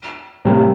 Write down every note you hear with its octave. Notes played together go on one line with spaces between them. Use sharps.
A2 C3 G3 A#3